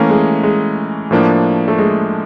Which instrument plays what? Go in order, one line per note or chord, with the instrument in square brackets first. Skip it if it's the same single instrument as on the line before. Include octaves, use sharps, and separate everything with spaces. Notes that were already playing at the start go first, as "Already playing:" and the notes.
Already playing: [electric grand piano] E3 A3 C#4 [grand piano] A#3
[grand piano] G#3
G#3
[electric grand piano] A2 F3 A#3 D4
[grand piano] A3
G#3